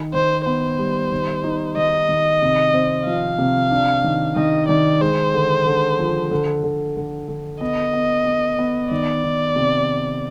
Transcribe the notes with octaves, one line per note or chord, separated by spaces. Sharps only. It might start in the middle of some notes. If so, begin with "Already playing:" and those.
Already playing: D#3
D#3 C5
B3 C5
G3
D#3
D#4
D#3 D#5
D#3
C3
C4
F3 F5
C3
D4
D#3
D#3 D#5
D#3 D5
G#3 C5
D3
D3
F3
D3
D3
D3
D3
B3 D#5
B3
B3
B3
D#3 D5
D#3
C3